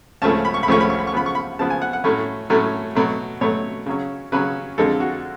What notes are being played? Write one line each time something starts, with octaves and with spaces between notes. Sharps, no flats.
C#2 C#3 F3 A3 C#4 A5
B5
C#6
B5
C#2 C#3 F3 A3 C#4 C#6
B5
C#6
B5
C#6
C#3 F3 B3 B5
C#6
B5
C#3 F3 B3 A5
G#5
F#5
F#5
A2 F#3 A3 C#4
A2 F#3 A3 C#4
B2 F#3 A3
B2 F#3 A3 C#5
C#3 F#3 C#4
C#3 F#3 C#4 B4
F2 D3 G#3 A4
F#4